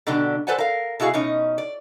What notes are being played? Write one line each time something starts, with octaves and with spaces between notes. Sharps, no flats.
B2 D3 F#3 D4 G4
A4 B4 C5 D5 F#5 G#5
A#4 F5
B2 E4 F#4 G#4 F5
B2 C#4 D#4
D5